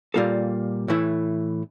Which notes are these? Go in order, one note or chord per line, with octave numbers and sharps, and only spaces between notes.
A#2 G3 A#3 F4 A4
A2 E3 A3 E4